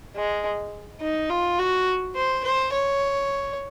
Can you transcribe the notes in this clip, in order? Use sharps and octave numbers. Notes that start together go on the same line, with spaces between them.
G#3
D#4
F4
F#4
C5
C5
C#5